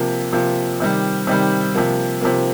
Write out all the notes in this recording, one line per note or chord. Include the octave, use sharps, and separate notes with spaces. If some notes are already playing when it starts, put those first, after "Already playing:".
Already playing: C3 F3 A#3
C3 F3 A#3
C3 D#3 G3
C3 D#3 G3
C3 F3 A#3
C3 F3 A#3